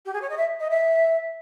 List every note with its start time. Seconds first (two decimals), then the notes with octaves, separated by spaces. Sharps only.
0.05 G4
0.13 G#4
0.21 C#5
0.30 D#5
0.37 E5
0.60 D#5
0.70 E5